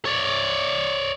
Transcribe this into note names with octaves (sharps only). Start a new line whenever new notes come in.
C#5 D5